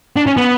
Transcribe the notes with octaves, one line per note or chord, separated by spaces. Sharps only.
D4
C#4
B3